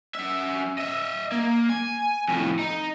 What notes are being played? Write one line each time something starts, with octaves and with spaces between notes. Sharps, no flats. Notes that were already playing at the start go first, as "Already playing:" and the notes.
F#2 E5
D#5 E5
A#3
G#5
F2 A2
D#4